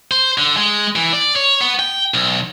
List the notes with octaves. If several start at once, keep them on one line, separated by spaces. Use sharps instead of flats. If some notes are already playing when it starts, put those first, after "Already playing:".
C5
D3
G#3
E3
D5
C#5
B3
G5
B1